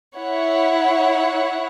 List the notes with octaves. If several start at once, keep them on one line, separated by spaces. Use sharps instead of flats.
E4 C#5 F#5